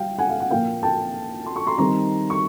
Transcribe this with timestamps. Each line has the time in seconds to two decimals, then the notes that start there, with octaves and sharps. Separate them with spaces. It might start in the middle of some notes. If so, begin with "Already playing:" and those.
Already playing: G3 F5 G5
0.18 F#5 G#5
0.29 F5
0.40 F#5
0.51 A#2 F3 A#3 F5 G5
0.83 G5 A5
1.46 C6
1.56 C#6
1.66 A#5 C6
1.78 D#3 G3 C4 D#4 A#5 C6
2.30 C#6